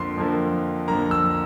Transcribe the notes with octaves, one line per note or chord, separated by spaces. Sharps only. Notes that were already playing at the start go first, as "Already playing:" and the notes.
Already playing: F2 D3 F3 A#3 C6
F2 D3 F3 A#3
F2 D3 F3 A#3 A#5
E6